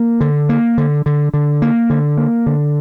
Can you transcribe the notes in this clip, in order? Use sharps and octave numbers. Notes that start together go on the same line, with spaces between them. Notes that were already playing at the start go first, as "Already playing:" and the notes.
Already playing: A#3
D3
A#3
D3
D3
D3
A#3
D3
A#3
D3